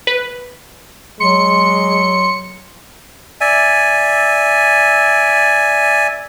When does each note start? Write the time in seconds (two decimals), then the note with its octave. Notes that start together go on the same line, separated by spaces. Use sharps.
0.07 B4
1.20 F#3 G#3 C6 C#7
3.41 D5 E5 G#5